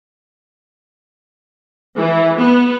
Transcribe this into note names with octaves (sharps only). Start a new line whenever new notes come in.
E3
B3